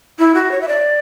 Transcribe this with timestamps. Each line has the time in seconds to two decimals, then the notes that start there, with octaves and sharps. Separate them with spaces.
0.19 E4
0.34 F#4
0.51 C#5
0.61 E5
0.68 D5